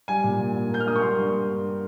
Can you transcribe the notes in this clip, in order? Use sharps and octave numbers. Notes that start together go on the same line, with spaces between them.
G3 G#5
A#2
A#2
A#2
A#3 G6
F6
A#3 D#6
C#6
G3 C6
G2